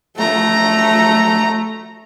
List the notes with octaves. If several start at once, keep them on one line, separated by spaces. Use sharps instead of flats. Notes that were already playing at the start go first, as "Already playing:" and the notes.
A3 A#5